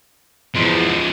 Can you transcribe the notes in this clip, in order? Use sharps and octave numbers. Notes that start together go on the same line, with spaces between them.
E2 G#2 F3